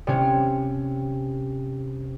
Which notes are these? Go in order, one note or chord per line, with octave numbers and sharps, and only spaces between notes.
C3 C#4